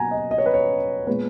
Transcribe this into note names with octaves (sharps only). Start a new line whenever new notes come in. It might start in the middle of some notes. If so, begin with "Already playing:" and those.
Already playing: B2 F#3 A#3 F#5 G#5 A#5
D#5
D#5
C#5
B4
C#5
A#2 G#3 B3 B4